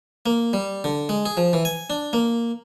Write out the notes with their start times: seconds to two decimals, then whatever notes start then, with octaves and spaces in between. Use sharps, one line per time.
0.26 A#3
0.53 G3
0.84 D3
1.09 G#3
1.26 G#4
1.37 F3
1.53 E3
1.65 G#5
1.90 D4
2.13 A#3